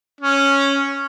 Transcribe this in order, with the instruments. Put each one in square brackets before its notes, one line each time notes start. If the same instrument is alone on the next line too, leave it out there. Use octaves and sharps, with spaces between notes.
[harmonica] C#4